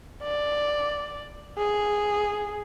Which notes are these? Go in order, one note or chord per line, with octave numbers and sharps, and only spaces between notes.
D5
G#4